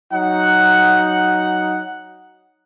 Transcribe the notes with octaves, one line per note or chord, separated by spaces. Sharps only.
F#3 D#4 F#5